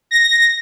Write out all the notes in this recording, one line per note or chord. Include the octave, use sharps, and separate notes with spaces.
A#6